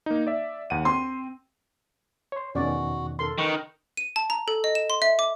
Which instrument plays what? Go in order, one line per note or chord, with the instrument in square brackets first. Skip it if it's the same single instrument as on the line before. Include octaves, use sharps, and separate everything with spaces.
[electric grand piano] A#3 D#4
D5 E5
D#2 F#5 D#7
[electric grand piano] C4 [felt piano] C6
[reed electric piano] C#5 C6
[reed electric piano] E2 B2 D#3 [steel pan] C#4 D5 [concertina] F#4
[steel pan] A4 A#4 C6
[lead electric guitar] D#3 [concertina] B4 [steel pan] B5 [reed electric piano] C#6
[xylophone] D#7
A5
A#5
A4
D#5
E7
C6
E5
D6